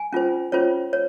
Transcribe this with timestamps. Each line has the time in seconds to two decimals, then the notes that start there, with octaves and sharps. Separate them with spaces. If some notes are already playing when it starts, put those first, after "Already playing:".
Already playing: G#5
0.13 C#4 F4 C5
0.52 C#4 F4 C5 C#5
0.93 C#5